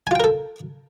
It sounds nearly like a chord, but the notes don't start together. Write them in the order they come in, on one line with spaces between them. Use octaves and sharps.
G#5 F4 G5 A#4 A4